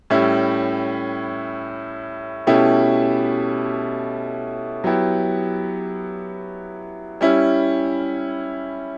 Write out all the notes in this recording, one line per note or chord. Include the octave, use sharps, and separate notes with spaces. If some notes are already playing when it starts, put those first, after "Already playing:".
A2 G3 C#4 E4
B2 A3 C#4 E4 G4
F#3 B3 E4 G4
G3 C#4 E4